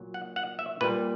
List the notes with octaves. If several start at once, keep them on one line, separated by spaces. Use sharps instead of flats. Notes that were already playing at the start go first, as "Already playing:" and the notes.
Already playing: A#2 F#3
F#5
F#5
E5
A#2 G3 B4